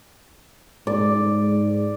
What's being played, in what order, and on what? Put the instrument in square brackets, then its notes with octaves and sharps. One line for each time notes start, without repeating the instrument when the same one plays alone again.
[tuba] G#2 [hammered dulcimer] D5